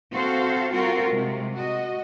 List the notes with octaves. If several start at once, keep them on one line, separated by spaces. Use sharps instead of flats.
C4 F#4 A4 C5 F5
G3 C4 F4 F#4 A#4
C3 G#3
F#4 D#5